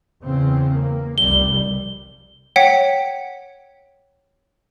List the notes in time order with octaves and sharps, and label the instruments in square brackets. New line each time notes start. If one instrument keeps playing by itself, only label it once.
[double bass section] E2 C#3 C4
A#3
[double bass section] F1 C2 G3 [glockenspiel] G7
[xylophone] C#5 F#5 G5 B6 C#7